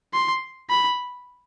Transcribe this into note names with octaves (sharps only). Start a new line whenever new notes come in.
C6
B5